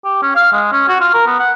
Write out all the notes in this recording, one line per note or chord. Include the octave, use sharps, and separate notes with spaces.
G4
C#4
F5
G#3
C#4
F#4
F4
A#4
B3
F#5